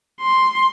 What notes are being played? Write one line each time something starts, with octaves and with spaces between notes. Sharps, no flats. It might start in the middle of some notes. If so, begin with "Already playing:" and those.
C6